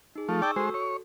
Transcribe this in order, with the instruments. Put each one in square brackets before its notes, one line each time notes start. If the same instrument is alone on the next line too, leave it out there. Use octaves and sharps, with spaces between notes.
[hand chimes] D#4 G#4
[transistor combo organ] F3 A3
[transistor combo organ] D5 G5 A5 [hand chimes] C#6 D#6 E6
[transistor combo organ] G#3 C5 [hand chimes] F#4 A4
[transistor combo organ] C#5